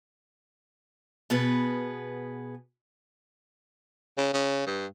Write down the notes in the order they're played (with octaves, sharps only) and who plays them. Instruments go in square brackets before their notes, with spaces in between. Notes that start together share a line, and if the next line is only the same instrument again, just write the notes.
[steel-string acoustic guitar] B2 B3 G#4 B4
[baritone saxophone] C#3
C#3
G2